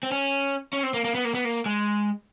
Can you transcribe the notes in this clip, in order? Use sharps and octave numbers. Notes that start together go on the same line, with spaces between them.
C4
C#4
C#4
C4
A#3
A#3
B3
A#3
B3
A#3
G#3